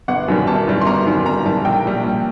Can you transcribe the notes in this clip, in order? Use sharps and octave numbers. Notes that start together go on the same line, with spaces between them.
G1 F#5
F#2 D#3 G3
G1 A5
F#2 D#3 G3
C6
G1 A#5
F#2 D#3 G3
G1 A#5
F#2 D#3 G3 A5
A#1 G5
A#2 G3
A#1